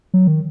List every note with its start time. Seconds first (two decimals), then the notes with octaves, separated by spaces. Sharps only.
0.14 F#3
0.27 D#3